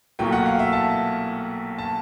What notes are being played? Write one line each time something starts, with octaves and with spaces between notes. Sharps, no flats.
B1 A#2 F#3 A3 G5
F#5
F5
E5
A5
A5